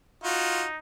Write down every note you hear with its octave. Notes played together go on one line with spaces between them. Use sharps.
D#4 F4 F#4